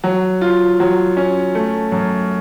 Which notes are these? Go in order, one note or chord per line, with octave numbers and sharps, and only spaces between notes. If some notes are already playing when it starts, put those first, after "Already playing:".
F#3
F4
F#3
C#4
A3
F#2